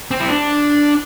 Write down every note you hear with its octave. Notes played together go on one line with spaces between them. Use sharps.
C4
E4
D4